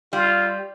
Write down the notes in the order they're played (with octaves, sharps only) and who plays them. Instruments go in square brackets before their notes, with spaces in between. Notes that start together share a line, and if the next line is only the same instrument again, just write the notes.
[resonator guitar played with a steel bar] G3 [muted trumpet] F4